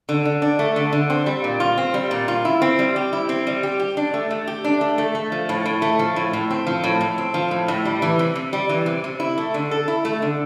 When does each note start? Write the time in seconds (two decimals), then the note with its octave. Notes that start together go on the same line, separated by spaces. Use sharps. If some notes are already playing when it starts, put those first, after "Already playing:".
0.09 D3
0.25 D3
0.42 D4
0.59 A3
0.76 D3
0.93 D3
1.10 C4
1.26 G3
1.44 A#2
1.60 F4
1.78 C4
1.94 G3
2.11 A#2
2.28 F4
2.45 E4
2.62 C4
2.79 G3
2.96 G4
3.13 E4
3.29 C4
3.47 G3
3.63 G4
3.80 G4
3.97 D4
4.14 A3
4.31 A3
4.47 G4
4.64 D4
4.81 A3
4.98 A3
5.15 A3
5.32 F3
5.49 A2
5.66 A2
5.82 A3
5.99 F3
6.16 A2
6.33 A2
6.50 C4
6.67 F3
6.84 A2
7.01 A2
7.18 C4
7.34 F3
7.51 A2
7.68 A2
7.85 G3
8.02 E3
8.19 C3
8.35 C3
8.53 G3
8.69 E3
8.86 C3
9.04 C3
9.20 E4
9.38 A3
9.54 D3
9.71 A4
9.88 E4
10.05 A3
10.22 D3